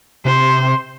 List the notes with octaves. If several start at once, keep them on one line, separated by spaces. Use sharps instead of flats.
C3 C5